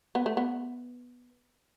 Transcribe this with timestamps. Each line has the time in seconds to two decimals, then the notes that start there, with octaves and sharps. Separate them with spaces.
0.15 B3
0.26 A3
0.37 B3